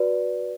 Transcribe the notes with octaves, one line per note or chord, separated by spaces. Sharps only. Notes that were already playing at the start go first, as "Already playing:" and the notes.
Already playing: F#4 B4 D5